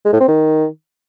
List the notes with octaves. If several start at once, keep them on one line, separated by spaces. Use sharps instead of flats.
G#3
A2
C4
D#3